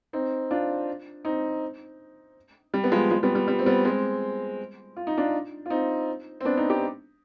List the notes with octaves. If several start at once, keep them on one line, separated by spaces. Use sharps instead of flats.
C4 D#4
D4 F4
C4 D#4
G3
B3
F3 G#3
F3 G#3
G3 B3
G3
G3
C4
G3 B3
G#3 C4
F4
D#4
D4 F4
F4
C4 D#4
C4
B3 D4
C4 D#4
D#4 G4